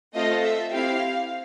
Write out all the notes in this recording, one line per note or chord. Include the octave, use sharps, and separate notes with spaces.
A3 C4 F4 A4 D#5
E5
C4 E4 G4 F5